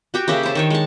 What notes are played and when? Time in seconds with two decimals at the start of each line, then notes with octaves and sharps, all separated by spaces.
0.14 F#4 G4 G5
0.28 C#3 A#3 G4 E5
0.43 C5 A5
0.55 D#3 D4 C#5
0.70 G#3 A5